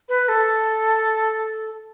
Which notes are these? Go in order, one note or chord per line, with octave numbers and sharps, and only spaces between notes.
B4
A4